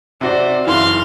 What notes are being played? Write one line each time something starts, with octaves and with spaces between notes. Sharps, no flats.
C3 F#4 C5 D5
F#1 E3 F5 C6